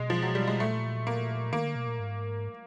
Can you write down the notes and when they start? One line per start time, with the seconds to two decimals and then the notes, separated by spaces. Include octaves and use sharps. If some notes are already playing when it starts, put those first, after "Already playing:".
Already playing: B2 G#3
0.10 F3
0.22 F#3
0.35 G3
0.47 G#3
0.60 A#2 A3
1.07 A#3
1.53 D#3 A#3
1.64 D3
1.76 B2
1.87 A#2
2.00 G#2